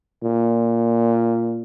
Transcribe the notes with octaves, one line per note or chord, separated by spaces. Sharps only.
A#2